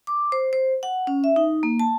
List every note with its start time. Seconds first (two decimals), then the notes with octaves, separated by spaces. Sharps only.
0.07 D6
0.32 C5
0.53 C5
0.83 F#5
1.07 C#4
1.24 E5
1.36 D#4
1.63 A#3
1.79 A5